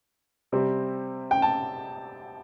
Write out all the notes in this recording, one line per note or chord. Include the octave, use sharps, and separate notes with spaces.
C3 G3 C4
G5
A5